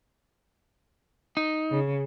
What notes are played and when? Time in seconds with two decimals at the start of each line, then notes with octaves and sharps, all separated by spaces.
1.37 D#4
1.71 C#3